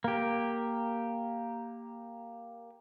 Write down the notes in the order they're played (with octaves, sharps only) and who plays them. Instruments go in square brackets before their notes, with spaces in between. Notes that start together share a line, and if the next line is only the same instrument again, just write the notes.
[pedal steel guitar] A#3 G4